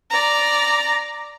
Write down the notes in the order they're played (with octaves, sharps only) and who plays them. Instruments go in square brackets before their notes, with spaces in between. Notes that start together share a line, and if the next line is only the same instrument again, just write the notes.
[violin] D5 A#5